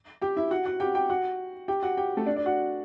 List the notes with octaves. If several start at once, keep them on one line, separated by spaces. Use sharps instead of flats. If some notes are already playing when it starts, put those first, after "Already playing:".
G4 G5
E4 E5
F#4 F#5
F#4 F#5
G4 G5
G4 G5
F#4 F#5
G4 G5
F#4 F#5
G4 G5
A3 A4
D4 D5
D4 D5
F#4 F#5